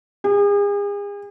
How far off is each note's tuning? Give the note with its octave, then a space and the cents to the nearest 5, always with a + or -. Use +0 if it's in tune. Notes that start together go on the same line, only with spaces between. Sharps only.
G#4 -40